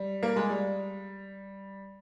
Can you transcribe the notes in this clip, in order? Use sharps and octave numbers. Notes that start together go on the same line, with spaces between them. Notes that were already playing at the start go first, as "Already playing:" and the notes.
Already playing: G3
A#3
G#3
G3